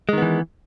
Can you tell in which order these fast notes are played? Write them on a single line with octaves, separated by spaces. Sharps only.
G#3 D#3 B3 E3